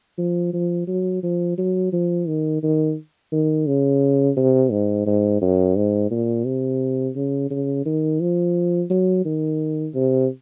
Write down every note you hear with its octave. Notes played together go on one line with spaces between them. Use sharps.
F3
F3
F#3
F3
F#3
F3
D#3
D#3
D#3
C#3
C3
G#2
G#2
F#2
G#2
A#2
C3
C#3
C#3
D#3
F3
F#3
D#3
C3